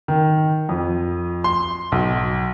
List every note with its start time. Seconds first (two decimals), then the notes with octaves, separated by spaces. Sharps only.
0.08 D#3
0.69 F2
1.44 C6
1.92 B1